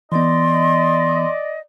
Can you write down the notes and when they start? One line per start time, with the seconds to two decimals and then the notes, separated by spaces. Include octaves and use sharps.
0.12 E3 B3 D5 D#5 C6